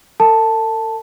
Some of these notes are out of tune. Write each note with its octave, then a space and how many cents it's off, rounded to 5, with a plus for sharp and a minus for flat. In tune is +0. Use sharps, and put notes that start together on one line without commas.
A4 +45 A5 +0